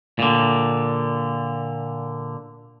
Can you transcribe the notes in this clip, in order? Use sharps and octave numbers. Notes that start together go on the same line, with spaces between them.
A#2 D3